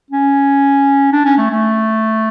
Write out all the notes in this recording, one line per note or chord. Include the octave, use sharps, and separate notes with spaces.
C#4
D4
C#4
A3
A3